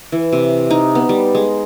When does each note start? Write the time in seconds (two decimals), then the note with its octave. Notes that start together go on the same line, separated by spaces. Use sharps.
0.12 E3
0.32 C3
0.70 D#4
0.95 B3
1.09 G3
1.35 G#3